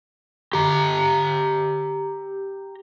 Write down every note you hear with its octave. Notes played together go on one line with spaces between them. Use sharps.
G4 A#5